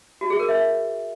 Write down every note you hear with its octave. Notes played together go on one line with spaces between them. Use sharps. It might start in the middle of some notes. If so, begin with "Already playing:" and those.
F#4
G#4
A#4
E5